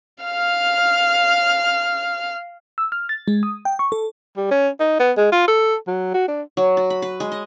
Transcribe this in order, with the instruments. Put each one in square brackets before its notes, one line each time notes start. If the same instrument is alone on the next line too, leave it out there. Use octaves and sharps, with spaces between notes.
[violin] F5 F6
[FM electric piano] E6
F6
A6
G#3
D#6
G5
C#6
A4
[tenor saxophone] G3
C#4
D#4
B3
G#3
F4
A4
F#3
F#4
D4
[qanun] F#3
F#4
B5
B4
G#3
D#5